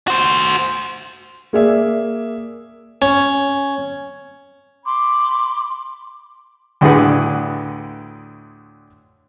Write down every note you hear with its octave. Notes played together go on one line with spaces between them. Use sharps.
F#4 C5
A#3 G#4 D5 E5
C#4
B5 C6 D6
D2 A2 D3 G#4 B4 F#5